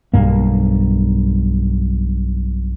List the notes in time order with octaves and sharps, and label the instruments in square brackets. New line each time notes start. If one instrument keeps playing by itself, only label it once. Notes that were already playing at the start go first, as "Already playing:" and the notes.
[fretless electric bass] B1 G2 A#3